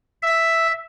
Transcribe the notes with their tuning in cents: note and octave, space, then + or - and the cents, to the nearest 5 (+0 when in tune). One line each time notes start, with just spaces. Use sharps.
E5 +0